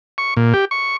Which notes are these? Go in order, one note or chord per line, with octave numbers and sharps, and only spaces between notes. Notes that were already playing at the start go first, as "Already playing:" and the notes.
C#6
A#2
G4
C#6